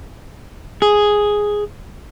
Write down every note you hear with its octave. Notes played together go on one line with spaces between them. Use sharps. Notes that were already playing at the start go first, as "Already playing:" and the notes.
G#4